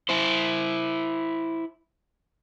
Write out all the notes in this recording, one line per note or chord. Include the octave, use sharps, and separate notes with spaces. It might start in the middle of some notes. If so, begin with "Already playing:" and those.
E4 C5